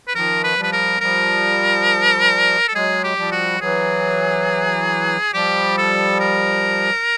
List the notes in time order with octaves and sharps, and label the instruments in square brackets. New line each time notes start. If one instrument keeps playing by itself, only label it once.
[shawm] B4
[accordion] D#3 F3 [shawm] A#4
[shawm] B4
[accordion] F3 G3
[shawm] B4
A#4
[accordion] F3 G3 [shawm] A#4
[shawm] A4
[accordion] F#3 G#3 [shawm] G#4
[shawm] G4
[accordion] F3 G3
[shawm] F#4
[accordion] E3 F#3 [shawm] G#4
[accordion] F3 G3 [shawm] G4
[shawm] A4
A#4